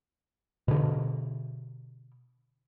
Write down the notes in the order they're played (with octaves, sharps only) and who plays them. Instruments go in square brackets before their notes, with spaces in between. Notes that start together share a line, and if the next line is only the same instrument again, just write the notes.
[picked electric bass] B2 D3